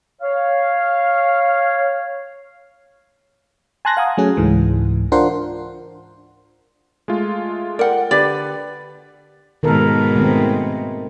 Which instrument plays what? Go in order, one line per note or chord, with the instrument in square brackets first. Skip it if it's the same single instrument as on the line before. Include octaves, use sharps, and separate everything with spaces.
[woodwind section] C#5 F5
[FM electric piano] G#5 A5 C6 F#6 G#6 A#6
F5 F#5 G#5 A#5 D#6
F#3 A3 C#4 G#4
C#2 G#2 E3
D4 F4 A#4 C5 F#5 C6
[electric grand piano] G#3 A3 F4
[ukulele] A#4 F#5 [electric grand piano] D5 G5
[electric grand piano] D3 B4 [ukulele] G4 D5
[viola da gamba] G#2 B2 [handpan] D#3 A4 A#4
[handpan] D#3 A3 C4